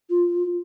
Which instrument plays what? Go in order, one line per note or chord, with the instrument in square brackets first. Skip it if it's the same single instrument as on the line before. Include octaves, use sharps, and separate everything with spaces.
[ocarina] F4